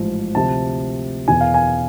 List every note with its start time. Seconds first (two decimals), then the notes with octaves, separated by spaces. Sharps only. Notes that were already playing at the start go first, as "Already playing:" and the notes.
Already playing: A1 G#2 F3
0.35 D2 C3 F3 A5
1.28 E2 B2 G#5
1.41 F5
1.54 G#5